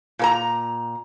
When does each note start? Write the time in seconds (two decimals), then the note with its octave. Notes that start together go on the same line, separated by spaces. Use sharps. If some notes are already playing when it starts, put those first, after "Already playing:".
0.19 A#2 A#4 A#5